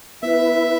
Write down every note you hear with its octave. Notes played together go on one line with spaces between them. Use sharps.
B3 E4 B4 E5